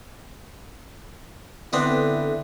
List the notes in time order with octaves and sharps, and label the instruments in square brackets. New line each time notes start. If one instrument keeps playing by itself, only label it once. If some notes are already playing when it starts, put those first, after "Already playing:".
[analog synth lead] D3 [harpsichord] B3 C4 D4 [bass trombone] E4